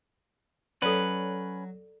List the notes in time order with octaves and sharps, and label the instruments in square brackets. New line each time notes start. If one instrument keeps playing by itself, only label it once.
[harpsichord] F#3 [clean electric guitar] C#4 B4 [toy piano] A4 D5